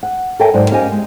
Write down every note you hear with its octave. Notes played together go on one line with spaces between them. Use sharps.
F#5
A4 A#4 C#5 E5 G5 G#5
G#2 F#3 C5 D5
A#3 C#4 G4 C5 D#5 G#5
G#3